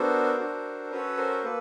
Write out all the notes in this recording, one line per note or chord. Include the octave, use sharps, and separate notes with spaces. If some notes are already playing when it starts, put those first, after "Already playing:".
Already playing: B3 D4 F#4 A4 A#4 C5
D4 F#4 A4
C#4 F#4 A4 B4 C#5
A#4 C5
A#3 A4 B4